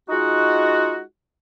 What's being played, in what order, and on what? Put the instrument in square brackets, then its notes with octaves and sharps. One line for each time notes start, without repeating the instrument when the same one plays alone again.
[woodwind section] G#3 D#4 F4 F#4